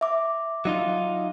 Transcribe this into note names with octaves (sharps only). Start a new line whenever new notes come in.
E5 D6
F#3 D#4 F4